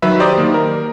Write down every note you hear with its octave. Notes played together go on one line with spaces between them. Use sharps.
D#3 F#3 B4 E5
G4 C5 D5 A#5 D#6
D#3 A#3
A#4